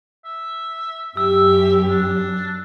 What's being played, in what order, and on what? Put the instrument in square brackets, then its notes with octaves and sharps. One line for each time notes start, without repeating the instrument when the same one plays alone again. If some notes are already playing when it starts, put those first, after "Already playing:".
[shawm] E5
[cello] F#2 [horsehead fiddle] G4 [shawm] E5 [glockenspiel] E6
[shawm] D4